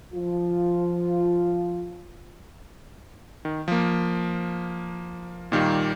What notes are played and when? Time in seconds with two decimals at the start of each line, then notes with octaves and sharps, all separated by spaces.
0.13 F3 F4
3.45 D#3
3.68 F3 A#3
5.52 A#2 D#3 G3 A#3